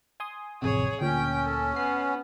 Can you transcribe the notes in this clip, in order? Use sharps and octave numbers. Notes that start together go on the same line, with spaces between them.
G#5 C6 D#6
A1 F2 C3 G#4 C#5
D2 A#2 C#4 G5
A4
B3 C7